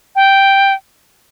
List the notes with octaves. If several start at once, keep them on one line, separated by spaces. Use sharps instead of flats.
G5